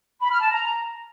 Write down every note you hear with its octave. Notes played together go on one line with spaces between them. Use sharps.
B5
F6
A5
A#5